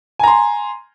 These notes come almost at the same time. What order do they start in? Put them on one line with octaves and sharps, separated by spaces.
G#5 A#5 C6